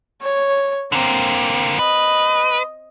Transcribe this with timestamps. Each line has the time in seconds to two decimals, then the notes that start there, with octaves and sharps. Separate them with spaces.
0.22 C#5
0.92 D3 A#3 C4
1.79 B4 D#5